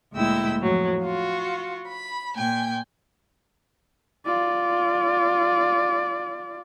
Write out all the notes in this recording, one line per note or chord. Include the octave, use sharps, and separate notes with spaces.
D2 A#2 G#3 E4 G5 E6
F2 A2 F#3
F4 F#4
B5
A#2 G5 G#5
F4 D5